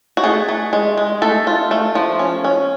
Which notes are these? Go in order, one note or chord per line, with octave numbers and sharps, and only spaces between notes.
F#4
A3 G#4
A3
G#3
G#3
A3 A4
F4
A3
F3
C#4
C#4